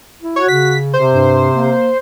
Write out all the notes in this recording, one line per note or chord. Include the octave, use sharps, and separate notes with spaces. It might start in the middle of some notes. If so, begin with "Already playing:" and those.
E4
F#4 C#5
C#3 B6
C3 C5
G2
A#3